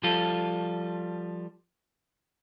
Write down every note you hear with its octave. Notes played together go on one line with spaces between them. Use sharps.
F3 G3 F4 A4